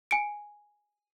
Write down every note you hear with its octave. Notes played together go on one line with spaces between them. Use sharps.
G#5 C#7 D7